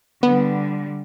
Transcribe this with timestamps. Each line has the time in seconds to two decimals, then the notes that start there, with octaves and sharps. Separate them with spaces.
0.23 D3 G3 B3